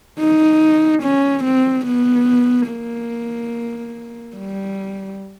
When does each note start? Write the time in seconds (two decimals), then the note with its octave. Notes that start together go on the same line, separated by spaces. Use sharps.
0.20 D#4
1.03 C#4
1.45 C4
1.86 B3
2.70 A#3
4.37 G3